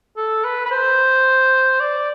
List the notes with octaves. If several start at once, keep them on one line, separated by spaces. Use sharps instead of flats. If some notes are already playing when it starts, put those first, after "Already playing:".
A4
B4
B4
C5
D5